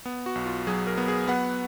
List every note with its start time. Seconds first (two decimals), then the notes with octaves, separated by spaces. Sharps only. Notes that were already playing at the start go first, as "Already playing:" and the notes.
0.06 B3
0.26 F#4
0.35 B1
0.46 F4
0.67 F#3 G#4
0.87 A#4
0.98 B3
1.08 G#4
1.27 B3 F#5